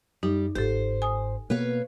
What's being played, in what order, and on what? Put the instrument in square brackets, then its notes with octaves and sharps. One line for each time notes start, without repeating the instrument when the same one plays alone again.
[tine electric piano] F#2 [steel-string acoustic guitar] G3 [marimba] D#4
[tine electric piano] G1 G#2 [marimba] G4 A4 [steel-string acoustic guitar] C5
[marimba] G#5 D#6
[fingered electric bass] B2 A#3 B3 [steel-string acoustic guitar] B4 C#5 F5